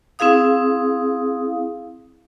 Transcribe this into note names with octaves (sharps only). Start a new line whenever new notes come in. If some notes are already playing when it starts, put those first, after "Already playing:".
C4 E4 G#4 F5 D#6